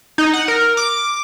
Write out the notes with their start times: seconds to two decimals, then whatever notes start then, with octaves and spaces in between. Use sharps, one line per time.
0.18 D#4
0.34 F#5
0.48 A#4
0.77 D6